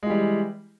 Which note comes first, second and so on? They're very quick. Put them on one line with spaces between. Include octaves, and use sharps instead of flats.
G#3 E3 G3